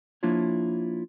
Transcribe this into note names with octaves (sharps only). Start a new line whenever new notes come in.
F3 A#3 D4 E4 F4 C#5